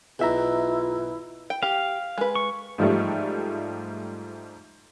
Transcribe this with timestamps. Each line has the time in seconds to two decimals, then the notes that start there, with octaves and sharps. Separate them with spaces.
0.19 B1 B2 E4 F4 G#4 E5 A#5
1.50 G5
1.63 G4 F5
2.18 G#3 B4
2.35 C#6
2.78 G#2 F3 G3 A3